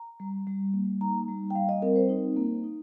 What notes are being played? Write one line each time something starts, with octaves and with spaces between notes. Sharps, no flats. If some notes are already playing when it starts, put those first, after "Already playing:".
Already playing: A#5
G3
G3
A#3
D#4 A#5
G3
G5
G3 F5
D#5
C4 A#4
C5
D#4
A#3
D#4